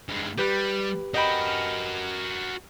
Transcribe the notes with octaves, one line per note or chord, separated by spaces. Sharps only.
G2 G#3
G3 G4 B4
F#4 A#4 D#5 G5 B5